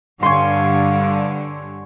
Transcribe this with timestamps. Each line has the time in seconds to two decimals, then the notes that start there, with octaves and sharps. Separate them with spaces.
0.23 G2 D3 C#5 F5 G#5 C6